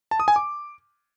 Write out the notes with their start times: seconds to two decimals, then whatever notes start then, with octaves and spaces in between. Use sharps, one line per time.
0.11 A5
0.20 D#6
0.28 G#5
0.36 D6